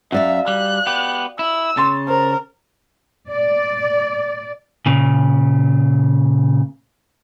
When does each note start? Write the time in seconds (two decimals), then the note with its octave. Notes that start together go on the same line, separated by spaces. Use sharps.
0.12 F#2 F#4 D5 E5 F5
0.48 G3 F#6
0.87 B3 G4
1.39 E4 E6
1.77 C#3 C6 A6
2.08 A#4 C5
3.30 D5
4.86 A#2 C#3